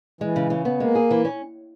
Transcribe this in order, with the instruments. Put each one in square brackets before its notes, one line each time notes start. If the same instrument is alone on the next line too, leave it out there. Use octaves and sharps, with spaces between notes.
[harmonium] E3 [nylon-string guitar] G#3
[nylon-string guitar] C#3
C#3
B3
[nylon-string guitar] G#3 [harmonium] A#3
[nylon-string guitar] G#4
E3
C#4